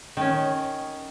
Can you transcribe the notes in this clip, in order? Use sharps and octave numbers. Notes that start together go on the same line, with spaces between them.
D#3 C#4